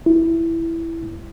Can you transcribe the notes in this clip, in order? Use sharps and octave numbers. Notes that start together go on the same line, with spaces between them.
E4